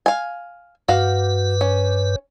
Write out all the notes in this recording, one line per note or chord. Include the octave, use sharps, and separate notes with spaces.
F5 G#5
G2 F#4 B4 F5
C#4